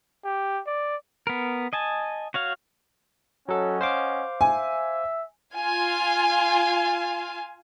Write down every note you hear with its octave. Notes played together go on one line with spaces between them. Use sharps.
G4
D5
B3 A#4
D#5 G#5 A5
F#4 C#5 F5
F#3 C#4 A4 D#5 F#5
C5 F5 D6
E5 G#5
F4 F5 G#5